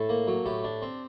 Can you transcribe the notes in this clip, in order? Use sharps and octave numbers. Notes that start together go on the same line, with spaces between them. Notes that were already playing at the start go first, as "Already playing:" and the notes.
Already playing: A2 A4
A#3
F#3
A2 G4
D4
C4